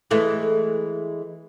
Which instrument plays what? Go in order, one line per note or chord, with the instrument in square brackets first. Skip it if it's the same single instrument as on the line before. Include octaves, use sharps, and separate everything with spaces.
[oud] E3 G#3 A3